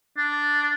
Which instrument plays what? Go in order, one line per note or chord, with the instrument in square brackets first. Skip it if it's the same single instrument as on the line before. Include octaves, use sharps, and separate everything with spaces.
[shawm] D4